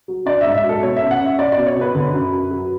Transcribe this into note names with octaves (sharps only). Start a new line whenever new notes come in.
F#3
D4 D5
G#2 E5
E5
F#3
A4
B2 C#5
E5
C#4
F#5
C#4
E5
C#4 D5
B2 D5
C#5
B2 B4
D3
F#2
F#2
F#3